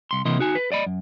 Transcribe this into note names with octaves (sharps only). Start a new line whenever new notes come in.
C2 C6
C3 E3 A#3 D#5 C6
D#4 F#4 G#5
B4
D5 D#5 B5
F#2